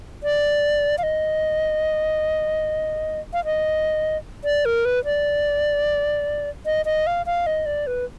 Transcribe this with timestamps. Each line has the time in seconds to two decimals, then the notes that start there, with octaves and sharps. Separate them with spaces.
0.23 D5
0.98 F5
1.03 D#5
3.33 F5
3.45 D#5
4.44 D5
4.65 A#4
4.85 B4
5.05 D5
6.66 D#5
6.85 D#5
7.07 F5
7.26 F5
7.47 D#5
7.66 D5
7.87 B4